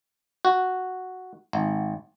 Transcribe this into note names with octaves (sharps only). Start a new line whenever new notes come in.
F#4
G#1